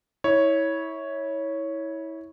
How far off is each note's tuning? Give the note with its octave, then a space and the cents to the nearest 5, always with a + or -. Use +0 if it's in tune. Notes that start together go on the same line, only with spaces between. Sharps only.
E4 -25 C#5 +0